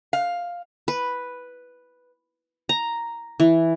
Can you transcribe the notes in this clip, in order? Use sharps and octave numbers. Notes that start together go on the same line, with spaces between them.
F5
B4
A#5
E3